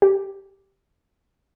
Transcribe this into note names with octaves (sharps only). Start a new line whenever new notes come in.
G4